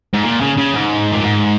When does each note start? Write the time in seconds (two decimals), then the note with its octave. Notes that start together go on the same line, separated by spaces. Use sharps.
0.14 G#2
0.24 A#2
0.41 C#3
0.57 C#3
0.74 G#2
1.12 A#2
1.23 G#2